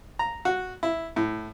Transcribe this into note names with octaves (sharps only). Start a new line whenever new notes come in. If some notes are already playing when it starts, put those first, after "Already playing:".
A#5
F#4
E4
A2